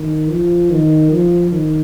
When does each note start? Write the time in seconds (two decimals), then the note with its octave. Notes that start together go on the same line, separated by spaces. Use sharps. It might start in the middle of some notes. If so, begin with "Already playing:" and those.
Already playing: D#3
0.29 F3
0.70 D#3
1.11 F3
1.51 D#3